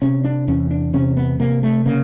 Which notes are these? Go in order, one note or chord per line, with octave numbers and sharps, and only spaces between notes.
C3 C#4
D4
E2 C#4
D4
C3 C#4
B3
C3 A#3
A3
C#3 A#3